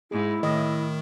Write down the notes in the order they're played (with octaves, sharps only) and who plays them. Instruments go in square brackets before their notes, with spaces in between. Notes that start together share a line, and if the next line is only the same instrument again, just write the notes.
[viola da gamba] G#2 [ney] E4 [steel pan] G#4
[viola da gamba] A2 [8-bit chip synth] D#3 [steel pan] D#5